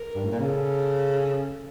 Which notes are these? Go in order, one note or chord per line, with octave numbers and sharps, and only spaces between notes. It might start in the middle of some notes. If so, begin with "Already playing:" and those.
Already playing: A#4
G2
A2
A#2
C#3 A4